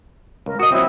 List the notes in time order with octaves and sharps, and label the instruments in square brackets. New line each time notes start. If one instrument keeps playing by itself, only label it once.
[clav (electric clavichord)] C#2 [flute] A#4
[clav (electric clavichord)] F#4 D#5 [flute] D#6
[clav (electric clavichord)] F#3 C4 [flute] E4